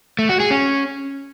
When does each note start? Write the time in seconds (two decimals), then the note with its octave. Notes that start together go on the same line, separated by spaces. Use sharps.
0.19 A3
0.29 F#4
0.40 G#4
0.51 C#4